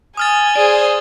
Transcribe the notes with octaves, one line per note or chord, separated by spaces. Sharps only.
G#5 D#6 F6 A6
G#4 C5 D5